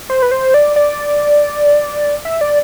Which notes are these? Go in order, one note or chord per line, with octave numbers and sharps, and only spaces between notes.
C5
B4
C5
D5
D5
E5
D5